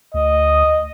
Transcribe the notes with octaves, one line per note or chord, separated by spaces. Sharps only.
D2 D#5